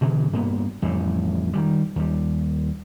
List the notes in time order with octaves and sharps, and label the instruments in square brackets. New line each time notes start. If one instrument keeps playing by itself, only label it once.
[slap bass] G2 B2 D3 E3
G2 A#3 B3
A1 F2 A2 G3
D#3 E3 G3
D#2 G3